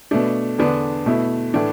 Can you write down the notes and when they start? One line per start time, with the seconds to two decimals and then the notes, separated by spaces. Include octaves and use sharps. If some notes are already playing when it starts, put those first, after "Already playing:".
0.11 B2 A3 D4
0.58 E2 D3 B3 D4
1.06 B2 A3 E4
1.54 A2 E3 A3 D4